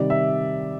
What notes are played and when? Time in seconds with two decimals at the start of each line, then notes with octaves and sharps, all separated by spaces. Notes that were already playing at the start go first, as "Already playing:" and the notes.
Already playing: C3 D#3 G3 D5
0.10 E5